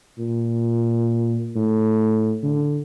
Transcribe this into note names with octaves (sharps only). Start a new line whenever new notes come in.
A#2
A2
D3